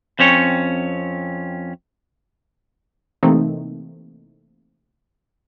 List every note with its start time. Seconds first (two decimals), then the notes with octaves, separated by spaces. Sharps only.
0.19 F2 C4 C#4 C#5
3.23 C3 E3 A3 A#3 C4 D#4